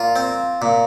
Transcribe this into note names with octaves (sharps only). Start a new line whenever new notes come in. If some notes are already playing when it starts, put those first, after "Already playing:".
Already playing: A#2 F4
C4
A#2